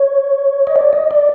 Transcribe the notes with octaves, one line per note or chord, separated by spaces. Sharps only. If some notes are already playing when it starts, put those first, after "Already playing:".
Already playing: C#5
D#5
D5
D#5
D5